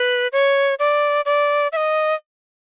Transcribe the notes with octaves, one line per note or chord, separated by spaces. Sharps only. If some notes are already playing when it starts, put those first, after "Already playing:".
Already playing: B4
C#5
D5
D5
E5
D#5